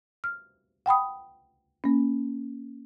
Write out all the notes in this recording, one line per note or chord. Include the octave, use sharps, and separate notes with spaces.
F6
F#5 G5 B5 D#6
A#3 C#4